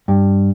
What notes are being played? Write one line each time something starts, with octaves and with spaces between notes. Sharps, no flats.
G2